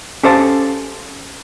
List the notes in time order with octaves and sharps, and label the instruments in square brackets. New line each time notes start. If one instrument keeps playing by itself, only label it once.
[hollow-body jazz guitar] C#4 G4 A4 C5 F5 A5